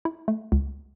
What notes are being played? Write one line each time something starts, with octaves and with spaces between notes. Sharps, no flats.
E4
A3
C#2